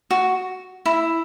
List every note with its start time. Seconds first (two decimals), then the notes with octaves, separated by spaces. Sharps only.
0.11 F#4
0.86 E4